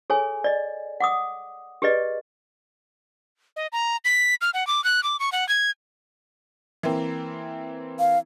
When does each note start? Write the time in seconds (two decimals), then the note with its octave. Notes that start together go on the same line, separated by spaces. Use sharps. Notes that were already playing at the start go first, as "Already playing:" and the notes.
0.10 G#4 A4 C#5 G#5
0.44 D5 D#5
1.00 F#5 D6 D#6
1.82 G4 G#4 B4 D5 D#5
3.56 D#5
3.72 A#5
4.05 B6
4.41 F6
4.54 F#5
4.67 D6
4.84 F#6
5.03 D6
5.20 C#6
5.32 F#5
5.49 G#6
6.83 E3 A#3 C4
7.99 F5